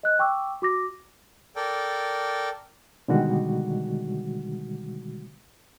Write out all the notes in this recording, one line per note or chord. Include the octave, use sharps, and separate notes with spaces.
D#5 F#6
G5 C#6 D6 E6
F#4 D6 A#6
A4 A#4 D5 G5
B2 D3 D#3 G3 G#3 F#4